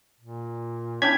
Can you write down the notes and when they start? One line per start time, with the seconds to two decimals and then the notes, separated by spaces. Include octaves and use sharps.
0.21 A#2
1.02 C#4 D4 E4 G5 G#6 B6